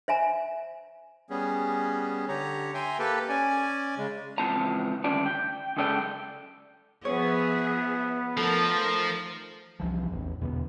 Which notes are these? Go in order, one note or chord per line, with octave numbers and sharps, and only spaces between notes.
C5 E5 G#5 A#5
G3 B3 C#4 G#4
D3 G4 C#5 A#5
E5 G5 G#5 A#5 C6
A#3 G4 A4 B4
C#4 D5 G#5
C#3 G#3
C#2 E3 F3 C4 A5 A#5
D2 D#3 G3 C#4 D5 A5
G5
C#2 F#2 C#3 A4 D5 G5
F3 B3 G#4 C#5 E5
F3 A3 D#4 A4 A#4
C2 E3 F3
A1 E2
E2 B2 D3 B3